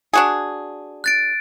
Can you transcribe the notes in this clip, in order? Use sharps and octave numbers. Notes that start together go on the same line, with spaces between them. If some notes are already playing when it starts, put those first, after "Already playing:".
D4 F#4 G#4
F#6 A6 D7